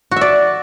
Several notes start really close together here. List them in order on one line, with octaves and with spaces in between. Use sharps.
F#4 E5 D5